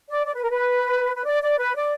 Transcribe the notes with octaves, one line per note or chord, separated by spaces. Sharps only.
D5
D5
B4
A#4
B4
B4
D5
D5
B4
D5